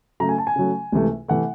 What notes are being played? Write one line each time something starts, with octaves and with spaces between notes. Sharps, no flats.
C#3 F#3 A3 A#5
G#5
A5
G#5
C#3 F#3 A3
C#2 C3 E3 A3
C3 E3 A3 F#5